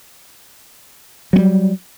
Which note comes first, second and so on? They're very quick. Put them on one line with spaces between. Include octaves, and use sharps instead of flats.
F#3 B3 G3